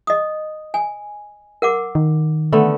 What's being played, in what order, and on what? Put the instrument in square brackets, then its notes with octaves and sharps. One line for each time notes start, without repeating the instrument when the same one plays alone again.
[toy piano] D#5 D#6
G#5
A#4 F#5 D6
[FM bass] D#3
[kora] D3 A3 B3